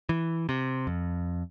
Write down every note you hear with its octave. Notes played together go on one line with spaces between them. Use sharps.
E3
C3
F2